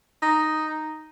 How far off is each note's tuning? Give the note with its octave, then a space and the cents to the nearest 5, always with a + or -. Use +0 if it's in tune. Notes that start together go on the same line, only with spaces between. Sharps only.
D#4 +0